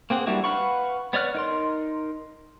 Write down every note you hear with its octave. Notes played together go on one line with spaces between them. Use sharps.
A#3 C4 G#4 F#5
G3 A#3 D4 E4 F#4
B4 F5 F#5 B5 C#6
B3 C#5 D5 F6 F#6
D#4 A#4 C6